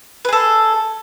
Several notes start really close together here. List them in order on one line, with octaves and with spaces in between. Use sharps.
B4 G#4 A4